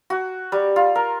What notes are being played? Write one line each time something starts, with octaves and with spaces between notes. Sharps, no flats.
F#4
G3
F4
A#4